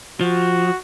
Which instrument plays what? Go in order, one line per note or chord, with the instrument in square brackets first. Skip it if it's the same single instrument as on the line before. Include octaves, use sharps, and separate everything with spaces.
[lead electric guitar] F3 [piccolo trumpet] F#4